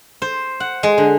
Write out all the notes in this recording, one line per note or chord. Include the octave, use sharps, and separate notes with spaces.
C5
F#5
G#3
D3